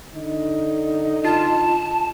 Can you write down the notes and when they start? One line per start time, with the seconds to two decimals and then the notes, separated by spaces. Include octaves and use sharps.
0.14 D3 D#4
1.24 F4 A5